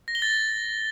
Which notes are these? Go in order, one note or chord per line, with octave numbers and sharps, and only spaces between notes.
A#6
G7
A6